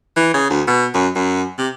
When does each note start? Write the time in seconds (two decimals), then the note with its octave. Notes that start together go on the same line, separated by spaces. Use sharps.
0.16 E3
0.34 C#3
0.50 D2
0.68 B2
0.94 F#2
1.16 F#2
1.58 C3